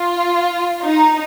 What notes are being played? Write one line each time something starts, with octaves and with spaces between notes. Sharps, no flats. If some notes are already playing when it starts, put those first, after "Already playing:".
Already playing: F4
D#4